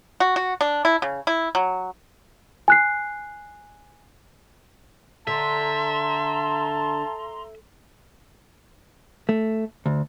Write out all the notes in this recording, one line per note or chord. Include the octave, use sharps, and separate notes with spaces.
F#4
F#4
D4
E4
C#3
E4
F#3
G#5 F#6 C7
D3 E5 A5 A#5 C6
A3
D2